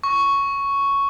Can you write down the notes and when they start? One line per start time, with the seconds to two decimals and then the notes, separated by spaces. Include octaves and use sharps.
0.04 C#6